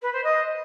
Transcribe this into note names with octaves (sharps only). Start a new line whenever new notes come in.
B4
C5
D#5